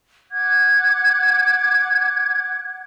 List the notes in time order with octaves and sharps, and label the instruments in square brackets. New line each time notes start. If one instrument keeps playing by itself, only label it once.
[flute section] F#5 D6 F#6 G#6